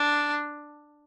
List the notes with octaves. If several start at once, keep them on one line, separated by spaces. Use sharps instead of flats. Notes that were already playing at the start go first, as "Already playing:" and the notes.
Already playing: D4